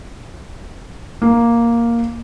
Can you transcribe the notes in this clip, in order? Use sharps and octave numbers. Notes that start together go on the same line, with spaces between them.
A#3